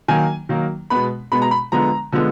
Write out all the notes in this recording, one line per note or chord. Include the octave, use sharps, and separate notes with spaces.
D#3 F#3 A#3 G#5
D#3 F#3 A#3
B2 G#3 B3 B5
B2 G#3 B3 B5
A#5
B5
D3 F3 G#3 B3 A#5
D3 F3 G#3 B3